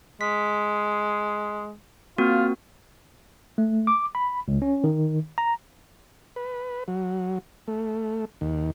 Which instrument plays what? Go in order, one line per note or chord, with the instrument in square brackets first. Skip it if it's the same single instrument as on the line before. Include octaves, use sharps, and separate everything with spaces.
[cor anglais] G#3 [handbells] B6
[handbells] A#3 C4 F#4 [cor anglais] F4
[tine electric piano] A3
D6
B5
C#2
C#4
D#3
A#5
[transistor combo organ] B4
F#3
A3
D#2